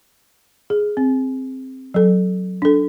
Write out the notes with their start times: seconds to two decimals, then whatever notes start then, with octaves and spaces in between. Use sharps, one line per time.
0.70 G#4
0.97 C4
1.94 F#3 A4
2.62 D4 A4